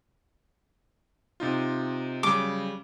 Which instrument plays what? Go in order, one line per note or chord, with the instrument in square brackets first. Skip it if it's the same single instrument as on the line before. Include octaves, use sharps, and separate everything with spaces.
[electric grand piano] C3 D#4 F4
[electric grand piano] C#3 F#3 G3 [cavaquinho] D6